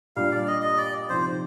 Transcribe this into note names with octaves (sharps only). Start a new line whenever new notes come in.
A#2 G3 D4 F5
D5
D#5
D#5
D5
C3 F3 C4 D#4 C5